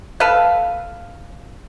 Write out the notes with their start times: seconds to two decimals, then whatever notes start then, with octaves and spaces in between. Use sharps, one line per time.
0.20 A4 B4 F5